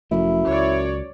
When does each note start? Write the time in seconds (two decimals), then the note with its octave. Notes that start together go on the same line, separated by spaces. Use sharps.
0.11 F1 F#2 F3 A3 E4
0.47 C#2 C#5 D5